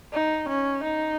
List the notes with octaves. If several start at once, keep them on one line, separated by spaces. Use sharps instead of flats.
D#4
C#4
D#4